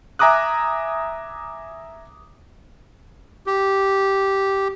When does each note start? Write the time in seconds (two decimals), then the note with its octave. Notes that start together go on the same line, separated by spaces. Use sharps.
0.19 E5 G#5 A#5 D6 D#6 F#6
3.47 G4